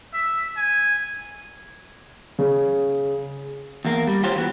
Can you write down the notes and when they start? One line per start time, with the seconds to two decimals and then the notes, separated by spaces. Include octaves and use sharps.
0.13 E5
0.57 G#5
2.39 C#3
3.85 E2 A#3
4.07 G3
4.23 F4 G4 C5 C#5
4.36 E3 F#3 B3